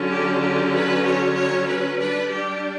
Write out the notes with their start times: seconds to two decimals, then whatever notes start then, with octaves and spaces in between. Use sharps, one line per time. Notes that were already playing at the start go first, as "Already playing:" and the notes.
Already playing: D3 F#3 C#4
0.10 G4
0.41 G4
0.73 B4
1.05 C#5
1.36 C#5
1.68 B4
1.99 G3 D4 B4
2.31 G4